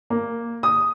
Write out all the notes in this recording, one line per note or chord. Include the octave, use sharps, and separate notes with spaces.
A#3
D#6